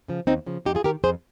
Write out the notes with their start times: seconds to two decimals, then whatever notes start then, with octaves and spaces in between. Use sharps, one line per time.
0.08 C#3 F3
0.27 D#2 C4 D#4
0.46 C#3 F3
0.65 F2 D#4 G4
0.75 F4 G#4
0.84 D#3 G4 A#4
1.04 F2 G#4 C5